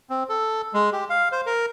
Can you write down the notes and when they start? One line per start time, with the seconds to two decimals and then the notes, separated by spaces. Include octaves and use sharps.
0.10 C4
0.29 A4
0.74 G#3
0.93 G4
1.10 F5
1.32 C5
1.46 A#4